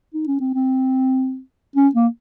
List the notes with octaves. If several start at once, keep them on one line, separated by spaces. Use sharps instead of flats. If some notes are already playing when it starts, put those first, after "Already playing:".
D#4
C#4
C4
C4
C#4
A#3